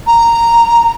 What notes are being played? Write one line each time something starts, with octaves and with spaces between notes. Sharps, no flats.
A#5